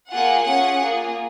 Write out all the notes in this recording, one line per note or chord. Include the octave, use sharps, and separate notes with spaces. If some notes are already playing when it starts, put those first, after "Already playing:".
A#3 F4 G#4 F#5
C#4 F4 G#4 F#5
A#3 F4 G#4